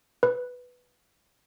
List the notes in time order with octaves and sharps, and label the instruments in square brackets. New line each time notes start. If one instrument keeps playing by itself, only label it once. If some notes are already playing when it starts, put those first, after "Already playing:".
[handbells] B4